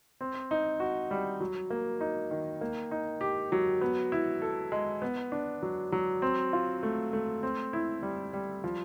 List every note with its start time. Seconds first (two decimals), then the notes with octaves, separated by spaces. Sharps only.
0.21 C4
0.51 D#4
0.80 F#4
1.11 G3
1.40 F#3
1.70 A#3
2.01 D#4
2.31 D#3
2.61 A#3
2.91 D#4
3.21 G4
3.52 F#3
3.81 B3
4.12 E4
4.42 A4
4.72 G#3
5.02 B3
5.32 D4
5.62 F#3
5.92 F#3
6.22 C4
6.53 F4
6.83 A3
7.13 A3
7.43 C4
7.73 E4
8.02 G3
8.33 G3
8.64 F3